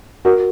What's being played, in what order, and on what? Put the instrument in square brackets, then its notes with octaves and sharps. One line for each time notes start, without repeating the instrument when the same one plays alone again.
[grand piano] F#4 A#4